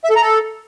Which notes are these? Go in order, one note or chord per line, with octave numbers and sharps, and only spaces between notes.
E5
A4
A#5
A4